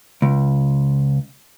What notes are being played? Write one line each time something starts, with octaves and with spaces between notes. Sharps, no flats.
C#2